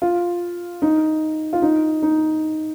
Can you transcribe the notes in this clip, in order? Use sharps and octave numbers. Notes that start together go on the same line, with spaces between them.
F4
D#4
F4
D#4
D#4